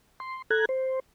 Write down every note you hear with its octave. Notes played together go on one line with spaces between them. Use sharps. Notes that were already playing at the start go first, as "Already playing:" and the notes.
C6
A4 A#5 F#6 G#6
C5